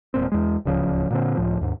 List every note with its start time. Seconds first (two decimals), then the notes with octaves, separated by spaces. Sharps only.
0.14 E1 A#2 C4
0.32 E2 G#3
0.65 D1 C#2 C#3 F3
1.11 A#2 D3 C4
1.37 C#2 A2 F3
1.61 D#2 G#2